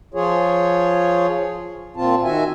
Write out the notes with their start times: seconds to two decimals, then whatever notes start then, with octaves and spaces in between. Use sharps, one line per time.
0.14 F3 F4 G#4 C#5
1.97 A#2 C4 F4 A5
2.24 D#3 F#4 E5 G#5